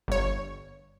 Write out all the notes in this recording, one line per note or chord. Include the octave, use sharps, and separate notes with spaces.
G1 C#5